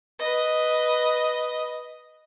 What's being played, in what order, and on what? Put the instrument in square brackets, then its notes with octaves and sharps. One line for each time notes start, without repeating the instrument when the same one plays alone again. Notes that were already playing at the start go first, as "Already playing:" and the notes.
[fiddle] B4 D#5